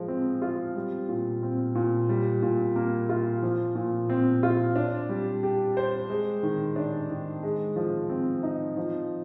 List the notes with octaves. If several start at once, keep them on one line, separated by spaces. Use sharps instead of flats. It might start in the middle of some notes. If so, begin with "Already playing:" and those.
Already playing: F3 G#3
C4
F4
G3
A#2
C4
A#2
G3
A#2
A#3
F4
F3
A#2
C4
F4
D4
G3
G4
C5
G#3
D#3
D4
D#3
G#3
F3
C4
D#4
F3